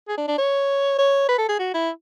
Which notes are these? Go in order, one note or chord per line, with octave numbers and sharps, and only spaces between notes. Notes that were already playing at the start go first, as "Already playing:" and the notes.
G#4
D4
D4
C#5
C#5
B4
A4
G#4
F#4
E4